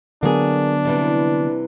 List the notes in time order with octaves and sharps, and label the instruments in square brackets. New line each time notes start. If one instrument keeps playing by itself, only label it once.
[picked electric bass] D3 F#3 B3 [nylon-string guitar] A#3 G#4 [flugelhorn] D4
[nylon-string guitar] C3 E3 G3